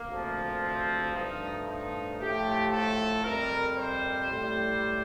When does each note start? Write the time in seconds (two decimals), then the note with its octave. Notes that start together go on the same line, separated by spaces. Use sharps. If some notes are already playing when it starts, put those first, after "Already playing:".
Already playing: A#3
0.09 D2 C3 F3
0.62 C4
1.15 G2 F3 A3 D#4
1.67 D#4
2.20 A2 F3 A3 G4
2.73 A4
3.25 F2 C3 G3 A#4
3.78 C5
4.31 A2 G3